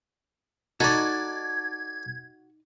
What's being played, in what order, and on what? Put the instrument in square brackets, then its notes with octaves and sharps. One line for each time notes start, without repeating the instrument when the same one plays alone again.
[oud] D#4 [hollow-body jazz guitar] F#4 [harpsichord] A4 D5 [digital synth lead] G#6